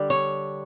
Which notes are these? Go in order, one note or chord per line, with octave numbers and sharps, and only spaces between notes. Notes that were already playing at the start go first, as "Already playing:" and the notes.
Already playing: D3 G3
C#5